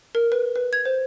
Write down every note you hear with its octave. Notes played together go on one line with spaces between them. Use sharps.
A#4
B4
B4
G#6
C5